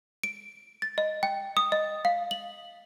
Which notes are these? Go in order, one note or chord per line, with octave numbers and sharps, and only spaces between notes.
D7
A6
D#5
G5
D#6
D#5
F5
F#7